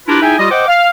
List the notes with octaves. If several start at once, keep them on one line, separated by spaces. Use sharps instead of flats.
D4 E4 F4 G4 A#4 B4
D#4 E4 G#4 E5 G5 G#5
G3 F4 G4 D#5
C5 D#5 F#5 G5 D6
F5